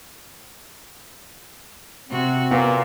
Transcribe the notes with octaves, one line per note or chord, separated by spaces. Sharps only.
C3 C4 F#4
A#2 B3